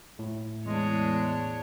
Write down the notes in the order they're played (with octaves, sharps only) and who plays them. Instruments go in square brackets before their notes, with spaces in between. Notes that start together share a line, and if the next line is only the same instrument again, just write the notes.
[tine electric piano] A2
[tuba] E2 [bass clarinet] G#3 [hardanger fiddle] D4 C#5